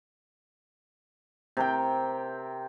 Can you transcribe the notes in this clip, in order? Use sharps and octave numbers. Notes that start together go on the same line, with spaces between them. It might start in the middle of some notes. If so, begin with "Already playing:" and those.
C3 A#4 G5